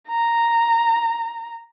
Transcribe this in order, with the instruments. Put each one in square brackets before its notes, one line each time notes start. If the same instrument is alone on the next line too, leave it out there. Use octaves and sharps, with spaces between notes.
[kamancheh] A#5